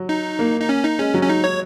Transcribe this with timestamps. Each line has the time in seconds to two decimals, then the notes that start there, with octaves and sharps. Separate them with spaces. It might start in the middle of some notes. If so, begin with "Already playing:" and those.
Already playing: F#3
0.09 D#4
0.39 A#3
0.60 D#4
0.69 C#4
0.84 D#4
0.99 G#3 C#4
1.14 F#3
1.23 C#4
1.29 D#4
1.44 C#5